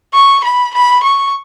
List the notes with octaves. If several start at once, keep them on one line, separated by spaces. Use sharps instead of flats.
C#6
B5
B5
C#6